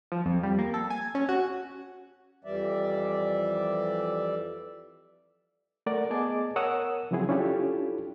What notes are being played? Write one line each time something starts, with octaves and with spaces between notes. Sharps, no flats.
F3
F2
G3
A#3
A4
G#5
C#4
F#4
F2 E3 G3 D5 E5
A3 A#4 D5 F#5
B3 G#4 D#5 G#5 A5 D6
A#4 C#5 F#5 D#6 E6
C#3 F3 F#3 C4 E4 G#4
C#4 D4 E4 F4 G4 A4